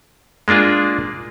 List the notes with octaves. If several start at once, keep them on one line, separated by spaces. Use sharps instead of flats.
G#3 A#3 D4 F4 G#4